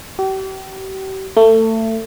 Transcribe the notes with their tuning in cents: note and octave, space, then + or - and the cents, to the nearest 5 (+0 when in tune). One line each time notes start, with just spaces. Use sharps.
G4 -40
A3 +25